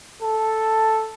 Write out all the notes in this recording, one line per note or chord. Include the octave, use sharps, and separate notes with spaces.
A4